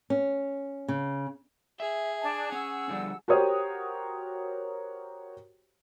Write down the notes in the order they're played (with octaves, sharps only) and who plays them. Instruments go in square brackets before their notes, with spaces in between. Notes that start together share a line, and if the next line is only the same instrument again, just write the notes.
[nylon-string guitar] C#4
C#3
[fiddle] G#4 [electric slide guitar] E5
[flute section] D4 A5
[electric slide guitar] C#4 [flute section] F#5 E6
[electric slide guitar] D3 F3 G3
[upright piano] F#4 G4 A#4 C5 C#5 D#6